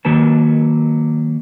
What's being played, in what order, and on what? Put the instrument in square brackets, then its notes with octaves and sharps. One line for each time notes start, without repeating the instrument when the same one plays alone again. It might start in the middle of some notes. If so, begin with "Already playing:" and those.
[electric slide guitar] D#3 F#3 A#3 B4 A5